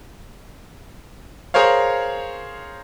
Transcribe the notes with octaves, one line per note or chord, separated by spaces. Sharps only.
G#4 A#4 C5 C#5 F5